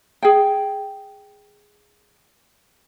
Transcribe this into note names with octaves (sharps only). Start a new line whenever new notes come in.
G#4 G5